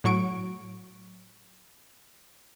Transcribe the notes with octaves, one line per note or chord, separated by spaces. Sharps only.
A2 F#3 C#6 D7